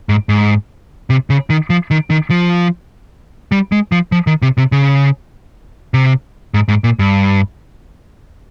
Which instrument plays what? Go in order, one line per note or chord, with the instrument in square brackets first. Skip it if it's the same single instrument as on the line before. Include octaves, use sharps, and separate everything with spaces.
[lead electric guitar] G#2
G#2
C3
C#3
D#3
F3
D#3
D#3
F3
G3
G#3
F3
F3
D#3
C3
C3
C#3
C3
G#2
G#2
A#2
G2